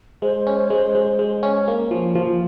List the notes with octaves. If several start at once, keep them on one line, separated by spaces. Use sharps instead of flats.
G#3 C5
C#4
G#3
G#3
G#3
C#4
A#3
F3
F3